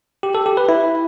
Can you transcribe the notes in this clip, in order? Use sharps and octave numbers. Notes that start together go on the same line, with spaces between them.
G4
A4
G4
B4
E4